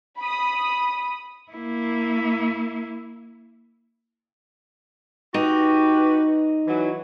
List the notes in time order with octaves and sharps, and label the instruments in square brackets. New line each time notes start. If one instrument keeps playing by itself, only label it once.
[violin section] B5 D#6
[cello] A#3 E4
[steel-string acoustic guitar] D#4 [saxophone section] F#4 G4 B4
[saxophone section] E3 F#3